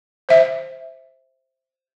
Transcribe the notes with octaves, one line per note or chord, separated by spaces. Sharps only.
C5 E5